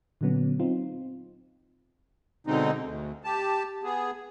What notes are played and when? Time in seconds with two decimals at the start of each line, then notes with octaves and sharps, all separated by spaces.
0.21 A#2 D3 F#3 B3 C#4
0.60 C4 D#4 F4
2.47 B2 D3 G#3 C4 D#4
2.84 D2
3.24 G4 A5
3.83 B3 G#4